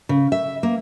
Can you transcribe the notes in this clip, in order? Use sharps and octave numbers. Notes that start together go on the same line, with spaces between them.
C#3
E5
A#3